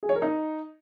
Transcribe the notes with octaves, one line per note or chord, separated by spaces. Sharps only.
G#4
C#5
A#4
D#4